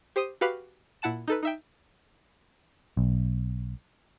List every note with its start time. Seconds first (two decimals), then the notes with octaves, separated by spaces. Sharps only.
0.16 G4 C5 C6 D#6 D#7
0.41 F#4 G4 B4 F5 B5 F#6
1.02 A#2 E4 F#5 A5 E7
1.28 D#4 A4 B4
1.43 D#4 E5 G5
2.97 B1